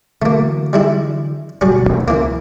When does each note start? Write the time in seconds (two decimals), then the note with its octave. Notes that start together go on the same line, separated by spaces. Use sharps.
0.22 D3 E3 F#3 A3 A#3
0.73 G3 G#3 E4
1.61 D1 G1 B2 F#3 G3 C#4
1.88 A1 D#2 D#3
2.08 C#2 C#3 E3 A#3